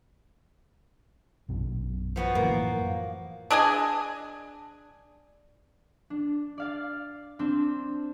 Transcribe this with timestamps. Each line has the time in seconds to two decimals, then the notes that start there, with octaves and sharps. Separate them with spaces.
1.49 A#1 F#2 B2
2.16 F3 B3 F#4
2.35 F#2 A2 E3 A#3
3.50 D4 G#4 D#5 G#5
6.10 D4
6.58 D5 F5 A6
7.39 C4 D4